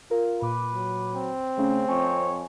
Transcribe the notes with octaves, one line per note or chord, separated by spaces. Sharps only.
F4 A#4
A#2 B4 D6
F#3
C4
C#3 A3 C#4
F2 C#5 G#5